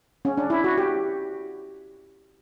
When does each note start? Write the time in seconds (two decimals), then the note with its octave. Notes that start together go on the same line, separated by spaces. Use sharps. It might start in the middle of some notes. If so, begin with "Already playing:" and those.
0.25 C#4
0.38 D4
0.50 E4
0.64 F#4
0.77 G4